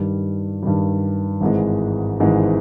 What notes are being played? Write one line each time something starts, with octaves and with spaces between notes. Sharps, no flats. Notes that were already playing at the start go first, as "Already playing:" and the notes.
Already playing: G2 D#3 G3
G2 D#3 G3
G#1 G#2 E3 G#3
G#1 G#2 E3 G#3